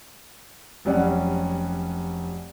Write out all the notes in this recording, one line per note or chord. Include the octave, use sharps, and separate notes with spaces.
F1 F#3 G3 C#4 D5 F#5